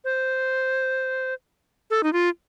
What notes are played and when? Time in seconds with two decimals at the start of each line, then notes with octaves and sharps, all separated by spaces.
0.04 C5
1.90 A4
2.03 D#4
2.13 F4